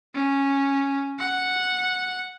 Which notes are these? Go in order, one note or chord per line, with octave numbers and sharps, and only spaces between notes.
C#4
F#5